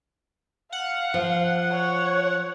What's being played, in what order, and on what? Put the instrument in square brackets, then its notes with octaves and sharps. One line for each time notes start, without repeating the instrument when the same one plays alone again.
[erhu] F5 [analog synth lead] F#5
[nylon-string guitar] F3
[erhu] C#5